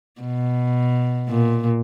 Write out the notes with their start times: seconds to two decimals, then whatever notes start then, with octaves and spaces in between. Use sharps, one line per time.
0.21 B2
1.29 A#2